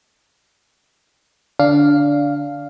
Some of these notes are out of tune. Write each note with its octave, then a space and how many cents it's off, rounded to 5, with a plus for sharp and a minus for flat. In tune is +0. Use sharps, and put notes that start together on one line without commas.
D3 -5 D4 -15 F5 +0